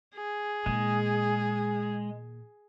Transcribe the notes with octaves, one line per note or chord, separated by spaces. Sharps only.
G#4
A#2 D#3 G#3